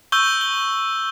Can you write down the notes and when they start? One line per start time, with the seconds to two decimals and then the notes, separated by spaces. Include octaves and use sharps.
0.12 C#6 E6 G6 G7
0.41 G7